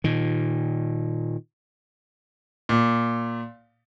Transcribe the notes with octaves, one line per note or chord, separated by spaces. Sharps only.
A#2 D#3
A#2